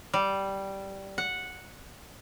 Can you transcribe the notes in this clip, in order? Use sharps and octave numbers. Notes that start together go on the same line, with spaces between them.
G3
F#5